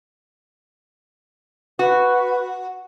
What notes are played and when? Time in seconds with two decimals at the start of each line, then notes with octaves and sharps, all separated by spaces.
1.79 F#4 B4